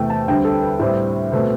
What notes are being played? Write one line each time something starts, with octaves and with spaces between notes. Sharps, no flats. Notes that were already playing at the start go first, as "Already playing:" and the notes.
Already playing: E2 C3 E3 A3 G5
A5
D2 D3 G3 C4 G5
A4
B4
A2 G3 C4
B2 A3 C4